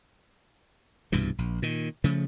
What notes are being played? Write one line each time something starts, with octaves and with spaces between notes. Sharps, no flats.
C2 G2 B2 E3
A#1
A#2 D#3
C#3 F3 A3